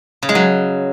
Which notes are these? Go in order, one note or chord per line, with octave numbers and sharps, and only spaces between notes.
C#3
G#3
F#3